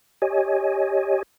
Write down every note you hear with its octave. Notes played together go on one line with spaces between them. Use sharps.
G4 C#5 D#5 G#5